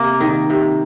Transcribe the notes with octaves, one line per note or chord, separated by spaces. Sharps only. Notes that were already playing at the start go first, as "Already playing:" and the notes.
Already playing: C3 A#3
D#3
C3